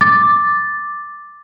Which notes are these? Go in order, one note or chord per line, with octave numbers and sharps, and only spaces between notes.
D6 A6